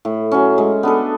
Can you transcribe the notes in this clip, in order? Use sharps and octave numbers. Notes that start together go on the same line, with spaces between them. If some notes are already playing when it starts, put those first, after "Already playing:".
A2
F#3 C#4
G#3
B3 D4 A4